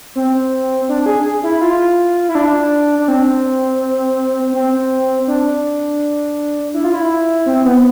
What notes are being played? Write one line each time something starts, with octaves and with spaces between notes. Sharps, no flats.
C4
D4
G#4
E4
F4
E4
D4
D4
C4
C4
D4
E4
F4
E4
C4
B3